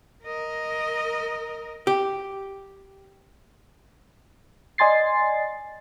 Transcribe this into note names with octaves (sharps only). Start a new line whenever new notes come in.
A#4 D#5
G4
D5 D#5 G#5 C6 A6 C7